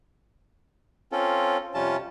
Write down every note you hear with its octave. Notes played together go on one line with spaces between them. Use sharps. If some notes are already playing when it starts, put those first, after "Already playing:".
C4 C#4 F4 A4
F2 C3 G3 C#4 F4 A5